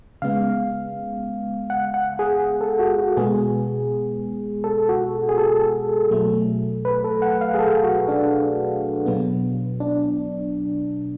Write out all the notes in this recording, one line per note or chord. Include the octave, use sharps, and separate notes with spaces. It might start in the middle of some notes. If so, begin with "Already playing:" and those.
C#3 G#3 B3 F5
F#5
F#5
G#4
A4
F#4
F#4
B2 G#3 B3 G#4
A4
F#4
G#4
A4
B2 F#3 A3
B4
A4
F#5
F5
G#4
A4
F#4
D4
B2 F#3 B3
D4